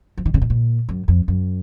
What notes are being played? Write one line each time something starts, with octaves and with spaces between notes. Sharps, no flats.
F3
D#3
C#3
B2
A#2
F#2
F2
F#2